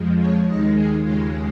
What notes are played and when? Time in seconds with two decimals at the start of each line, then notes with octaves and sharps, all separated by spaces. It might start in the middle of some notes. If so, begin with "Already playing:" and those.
Already playing: F2 F3 G#3
0.18 C#5
0.46 D#2 D#3 G#3 D#5
0.75 G#4
1.03 D#2 C#3 G#3 F4